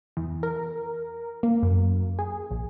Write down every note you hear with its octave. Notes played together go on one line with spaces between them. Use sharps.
E2
A#4
A#3
F#2
G#4
A#1